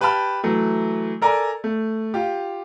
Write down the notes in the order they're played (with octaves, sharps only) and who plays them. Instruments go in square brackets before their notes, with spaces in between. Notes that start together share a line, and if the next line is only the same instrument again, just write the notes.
[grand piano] G4 B4 G5 A5 B5 F6
E3 F#3 A3
A4 A#4 D5 G#5
A3
F4 G4